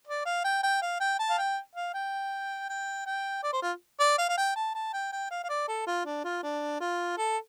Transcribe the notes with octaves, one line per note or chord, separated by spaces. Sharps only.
D5
F5
G5
G5
F5
G5
A5
F5
G5
F5
G5
G5
G5
D5
C5
F4
D5
F5
F5
G5
A5
A5
G5
G5
F5
F5
D5
A4
F4
D4
F4
D4
F4
A4